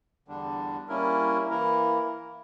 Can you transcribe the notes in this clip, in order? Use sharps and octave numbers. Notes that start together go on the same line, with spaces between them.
E2 D3 G3 D4
G3 A#3 C#4 E4 A#4
E3 A#3 E4 A#4